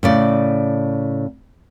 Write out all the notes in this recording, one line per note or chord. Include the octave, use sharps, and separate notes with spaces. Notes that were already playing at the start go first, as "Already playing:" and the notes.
A2 C#3 D5